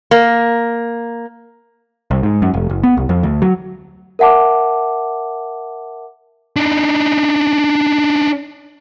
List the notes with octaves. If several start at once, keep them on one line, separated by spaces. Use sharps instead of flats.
A#3
C2
G#2
F#2
F1
F#1
B3
C2
F2
D2
F#3
A#4 E5 F#5 A5 D6
D4 D#4